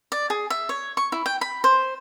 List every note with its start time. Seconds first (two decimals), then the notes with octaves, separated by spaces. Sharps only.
0.12 D5
0.30 G#4
0.50 E5
0.69 C#5
0.97 C#6
1.12 E4
1.26 G5
1.41 B5
1.64 C5